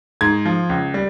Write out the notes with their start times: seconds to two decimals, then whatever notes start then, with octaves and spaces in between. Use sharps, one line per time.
0.21 G#2 G#6
0.45 F3
0.69 C#2
0.94 G3